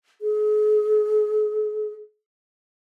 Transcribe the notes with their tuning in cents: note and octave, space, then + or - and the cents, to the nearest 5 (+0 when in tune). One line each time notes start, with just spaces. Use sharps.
G#4 +40